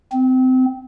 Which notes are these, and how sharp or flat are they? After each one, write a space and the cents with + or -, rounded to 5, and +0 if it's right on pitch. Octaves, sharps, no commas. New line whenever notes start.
C4 -25